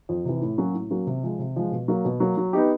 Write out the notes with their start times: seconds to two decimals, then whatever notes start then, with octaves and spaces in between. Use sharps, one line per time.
0.09 F2
0.25 C3 E3
0.41 A2
0.58 F#3 A#3 C#4 F#4
0.74 A2
0.90 F#3 A#3 C#4 F#4
1.07 C3
1.23 F3 G#3
1.39 C3
1.56 F3 G#3
1.72 B2
1.88 F#3 A#3
2.05 B2
2.20 F#3 A#3
2.37 F#3
2.53 B3 D#4 G4